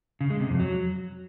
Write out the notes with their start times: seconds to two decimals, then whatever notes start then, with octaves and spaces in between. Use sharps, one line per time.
0.21 C#3
0.30 G#3
0.40 C3
0.50 F2
0.60 F#3